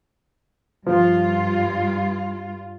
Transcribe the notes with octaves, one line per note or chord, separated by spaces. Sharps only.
G2 F3 F4